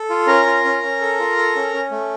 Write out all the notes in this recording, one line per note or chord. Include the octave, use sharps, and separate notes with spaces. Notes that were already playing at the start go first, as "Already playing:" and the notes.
Already playing: A4
F4
C#4 A#4 A#5
F4
C#4
C#4
A4
F4
A4
C#4
C#4
A3